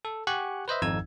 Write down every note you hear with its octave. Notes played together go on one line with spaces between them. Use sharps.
A4
G4 F#5 G#5 C#6 F#6
B4 C5 D#5 E5
G#1 F2 D#4 E6 G#6